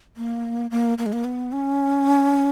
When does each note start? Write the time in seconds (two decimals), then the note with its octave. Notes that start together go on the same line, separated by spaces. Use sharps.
0.17 A#3
0.71 A#3
0.98 A#3
1.06 G#3
1.13 A#3
1.24 B3
1.52 C#4